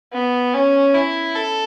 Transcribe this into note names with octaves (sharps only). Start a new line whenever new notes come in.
B3
C#4
E4
A4